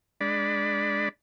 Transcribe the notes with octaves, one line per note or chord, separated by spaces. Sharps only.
G#3 D4 D5 B5